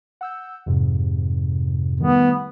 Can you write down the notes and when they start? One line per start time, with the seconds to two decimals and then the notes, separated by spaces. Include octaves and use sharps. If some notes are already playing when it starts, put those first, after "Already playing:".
0.21 F#5 E6 G6
0.66 F2 G#2 C3
2.01 D#3 G3 A3 B3